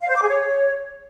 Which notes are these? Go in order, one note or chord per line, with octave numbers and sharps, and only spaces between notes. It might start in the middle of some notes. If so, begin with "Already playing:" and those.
F5
C5
D6
G#4
C#5